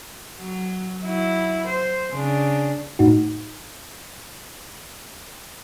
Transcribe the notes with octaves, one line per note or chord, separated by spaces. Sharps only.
F#3
F#3 E4
C5
C#3 D4
A2 D#4 F#4